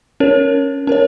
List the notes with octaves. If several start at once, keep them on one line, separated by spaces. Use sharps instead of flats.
C#4 A#4 C#5
C#4 A#4 C#5